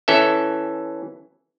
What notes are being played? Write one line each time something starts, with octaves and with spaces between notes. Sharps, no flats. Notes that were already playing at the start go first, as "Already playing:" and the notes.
E3 C#4 A4 E5